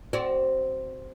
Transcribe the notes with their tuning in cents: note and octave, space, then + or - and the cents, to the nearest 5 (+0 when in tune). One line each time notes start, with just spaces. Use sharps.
C4 +0 F#4 +30 D5 +0